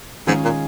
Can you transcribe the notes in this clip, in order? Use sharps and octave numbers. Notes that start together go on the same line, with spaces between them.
G#2 D#3 G#3 C#4 F4 G#4
A#2